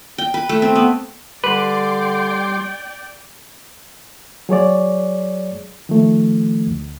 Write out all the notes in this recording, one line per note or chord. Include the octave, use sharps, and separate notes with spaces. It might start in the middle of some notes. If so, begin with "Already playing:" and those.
G5
B4
A3
C4
B3
D3 G3 B4 D5 G5 C6 D6
F#3 G#4 C#5 D5
D#3 F3 A3
D2